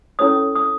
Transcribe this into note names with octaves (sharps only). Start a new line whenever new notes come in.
C#4 E4 A4 C#5 D#6
D#6